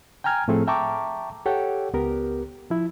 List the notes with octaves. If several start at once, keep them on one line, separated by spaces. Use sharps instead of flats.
G5 G#5 A#5 F6 G#6
A2 F3 A3 C4 G#4 A4
E5 G5 A5 A#5 C#6 D6
G4 A4 C#5 F#5 G5
C#2 B3 G4 A#4
F3 E4